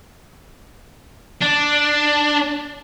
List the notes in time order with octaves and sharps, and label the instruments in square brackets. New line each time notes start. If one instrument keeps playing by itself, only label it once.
[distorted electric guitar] D4